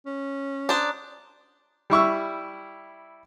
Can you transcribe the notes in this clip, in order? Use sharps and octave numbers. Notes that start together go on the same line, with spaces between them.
C#4
D4 C5 A#5 D#6 F#6
G3 E4 C#6 E6